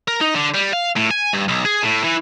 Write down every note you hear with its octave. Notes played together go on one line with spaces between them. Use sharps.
A#4
D#4
D3
G3
F5
A2
G#5
G2
B1
G#4
A2
E3